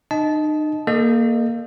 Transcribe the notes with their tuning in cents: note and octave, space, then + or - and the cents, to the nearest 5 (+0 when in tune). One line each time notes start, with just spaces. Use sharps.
D#4 -40 D#5 +10 A5 -20
A#3 +0 A4 -40 D#5 -20